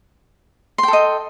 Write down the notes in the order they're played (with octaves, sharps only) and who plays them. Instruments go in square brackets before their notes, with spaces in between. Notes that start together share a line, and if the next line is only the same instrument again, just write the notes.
[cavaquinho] C6
G5
A4
D#5